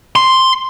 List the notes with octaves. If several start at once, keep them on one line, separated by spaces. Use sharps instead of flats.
C6